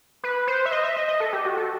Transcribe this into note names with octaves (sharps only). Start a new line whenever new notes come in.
B4
C5
E5
D#5
E5
D#5
D#5
A4
G4
F#4
A4